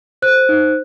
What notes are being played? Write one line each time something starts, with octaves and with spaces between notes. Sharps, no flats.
C5 F#6
D#4